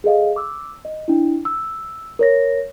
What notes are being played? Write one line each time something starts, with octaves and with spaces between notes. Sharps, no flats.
G#4 A4 D#5 F5
D6 E6
D#5
D4 E4
E6
A#4 C#5 A#6